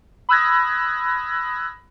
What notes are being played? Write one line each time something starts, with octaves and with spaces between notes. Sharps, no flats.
B5 D#6 E6 F#6 G#6 A#6